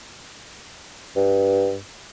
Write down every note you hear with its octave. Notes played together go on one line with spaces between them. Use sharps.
G2